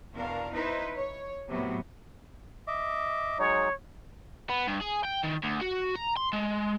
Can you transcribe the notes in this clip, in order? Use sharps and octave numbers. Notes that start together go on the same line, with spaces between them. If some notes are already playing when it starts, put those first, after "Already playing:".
E2 B2 D4 A#4 F5
D#4 E4 B4 C5
C#5
A2 C3 F#3 B3
D#5 E5 D6
F#3 G#3 D#4 C#5
B3
G2
G#4
G5
D#3
D2
F#4
A#5
C6
G#3